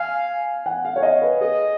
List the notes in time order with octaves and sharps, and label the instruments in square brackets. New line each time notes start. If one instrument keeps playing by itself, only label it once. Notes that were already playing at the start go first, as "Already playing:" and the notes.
Already playing: [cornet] F5 [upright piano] G#5
[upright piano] F#5
F5
C#5
D#5
B4
[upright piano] G#4 [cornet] D#5